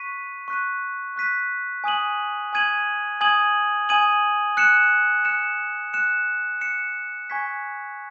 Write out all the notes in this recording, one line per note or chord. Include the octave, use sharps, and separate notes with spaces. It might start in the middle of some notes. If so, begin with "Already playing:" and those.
Already playing: C#6 F#6 B6 D#7
C#6 F#6 B6 D#7
C#6 F#6 B6 D#7
G#5 D#6 G#6 D#7 F#7
G#5 D#6 G#6 D#7 F#7
G#5 D#6 G#6 D#7 F#7
G#5 D#6 G#6 D#7 F#7
F#6 C#7 E7
F#6 C#7 E7
F#6 C#7 E7
F#6 C#7 E7
G#5 C#6 G#6 B6